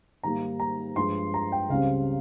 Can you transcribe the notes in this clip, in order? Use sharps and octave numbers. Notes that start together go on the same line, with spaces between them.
G#2 D#3 G3 A#3 A#5
A#5
G2 F3 G#3 C6
A#5
G5
C#2 C#3 G3 C4 F5